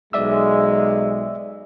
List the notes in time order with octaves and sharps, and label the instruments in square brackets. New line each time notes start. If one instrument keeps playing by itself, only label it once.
[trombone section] B1 G#3 [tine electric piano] D5 E5 E6